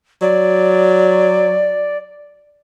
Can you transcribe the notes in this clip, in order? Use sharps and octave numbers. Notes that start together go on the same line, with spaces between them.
F#3 D5